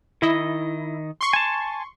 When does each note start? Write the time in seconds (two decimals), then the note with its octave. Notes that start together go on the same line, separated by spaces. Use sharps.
0.22 D#3 E4 D#5
1.21 C6 C#6
1.33 G#5 A5